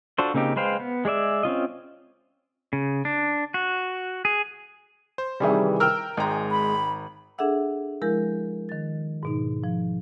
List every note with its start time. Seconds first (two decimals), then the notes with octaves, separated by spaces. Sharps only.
0.18 D4 F4 F#4 A4 C5
0.34 C#3 A#3 C4 D#4 G4
0.56 G#3 B4 C5 F5 G5
0.80 B3
1.05 G#3 G#4 D5 E5
1.43 C4 C#4 F4 D#5
2.73 C#3
3.05 D4
3.54 F#4
4.25 G#4
5.18 C5
5.40 C3 D#3 E3 G3 G#4 E5
5.80 A#4 G5 E6 F6
6.17 G#1 G#3 G5 A#5
6.51 B5
7.38 D4 G#4 A4 E5 F#5 E6
8.02 F3 G#3 E4 A#4 G6
8.69 D#3 A6
9.23 G#2 B2 D#4
9.63 F3